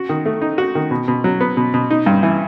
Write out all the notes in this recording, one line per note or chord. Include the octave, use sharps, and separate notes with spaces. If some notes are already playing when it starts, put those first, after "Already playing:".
Already playing: F#4
D#3
A3
D#4
F#4
D#3
B2
B2
F#3
B3
B2
B2
D#4
G2
E3